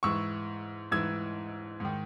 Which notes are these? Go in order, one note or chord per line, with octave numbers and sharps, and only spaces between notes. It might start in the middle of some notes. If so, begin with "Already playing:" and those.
G#2 E3 C#6 E6
G#2 E3 E6 G#6
G#2 D#3